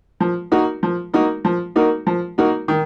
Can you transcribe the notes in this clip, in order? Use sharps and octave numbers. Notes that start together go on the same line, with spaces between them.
F3
A#3 D#4 F#4 A#4
F3
A#3 D#4 F#4 A#4
F3
A#3 D#4 F#4 A#4
F3
A#3 D#4 F#4 A#4
D#3